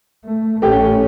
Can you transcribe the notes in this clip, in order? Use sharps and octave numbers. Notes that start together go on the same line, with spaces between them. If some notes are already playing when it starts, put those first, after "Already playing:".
A3
A1 A3 C#4 G4